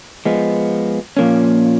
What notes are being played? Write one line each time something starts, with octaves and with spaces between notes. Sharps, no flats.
F3 G#3 B3
A#2 F3 A#3 C#4